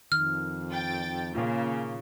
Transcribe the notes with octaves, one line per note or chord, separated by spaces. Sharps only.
F2 D#3 F6
G5 A6
A#2 C#3 A#3 F4